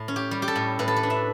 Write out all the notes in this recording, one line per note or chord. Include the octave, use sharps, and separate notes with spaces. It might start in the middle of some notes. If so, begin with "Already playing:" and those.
Already playing: A2
C#4
G4
G3
G4
A4
A2
A2 B4
A4
B4
D4
E5